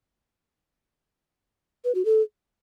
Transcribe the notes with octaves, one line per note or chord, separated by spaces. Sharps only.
B4
F#4
A4